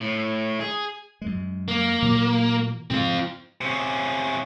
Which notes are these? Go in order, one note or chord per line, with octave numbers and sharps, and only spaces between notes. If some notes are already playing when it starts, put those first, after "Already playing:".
A2
G#4
F#2 G#3
A#3
A#2 E3 F#3
G#2 C#3 F3 C4 F4
C3 C#4